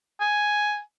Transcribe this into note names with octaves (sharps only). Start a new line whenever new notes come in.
G#5